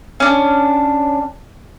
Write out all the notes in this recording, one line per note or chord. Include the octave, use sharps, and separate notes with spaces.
C#4 D4